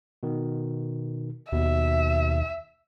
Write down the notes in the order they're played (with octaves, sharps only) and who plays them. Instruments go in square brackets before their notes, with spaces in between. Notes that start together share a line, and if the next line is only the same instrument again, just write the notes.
[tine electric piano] B2 D#3
[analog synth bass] D#2 [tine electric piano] B2 [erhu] E5